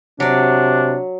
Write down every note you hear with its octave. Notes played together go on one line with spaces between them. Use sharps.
C3 F#3 D4 D5